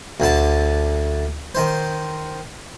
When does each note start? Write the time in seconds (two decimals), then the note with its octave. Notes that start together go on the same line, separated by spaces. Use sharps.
0.20 D2 D3 A5
1.55 D#3 C5